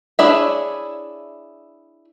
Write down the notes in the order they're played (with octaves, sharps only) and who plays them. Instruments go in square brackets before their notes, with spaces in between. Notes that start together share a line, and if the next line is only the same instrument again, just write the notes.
[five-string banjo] D4 E4 G#4 C#5 E5